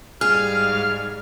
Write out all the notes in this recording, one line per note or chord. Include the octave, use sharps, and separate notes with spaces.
G#2 G3 G#4 F5 F6